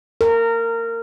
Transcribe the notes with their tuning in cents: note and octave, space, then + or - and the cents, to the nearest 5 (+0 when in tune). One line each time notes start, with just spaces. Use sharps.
A#4 -20